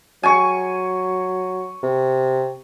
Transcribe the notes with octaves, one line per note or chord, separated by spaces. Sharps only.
F#3 G#5 C#6
C3